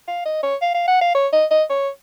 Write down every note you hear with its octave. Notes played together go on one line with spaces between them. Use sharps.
F5
D#5
C#5
F5
F5
F#5
F5
C#5
D#5
D#5
C#5